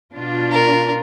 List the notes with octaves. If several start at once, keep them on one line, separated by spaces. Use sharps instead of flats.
B2 D4 F4
A#4